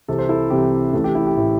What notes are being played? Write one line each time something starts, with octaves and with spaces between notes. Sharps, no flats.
C2 C3 E3 A4
C5
E4 A4
C2 C3 E3 G4
A1 A2 E3 A4
G4
E4
G4
A2 E3